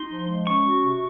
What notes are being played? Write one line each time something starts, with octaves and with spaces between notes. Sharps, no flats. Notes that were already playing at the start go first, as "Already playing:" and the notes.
Already playing: D#4 C6
F3
G#3
C#4 C#6
F#4
C3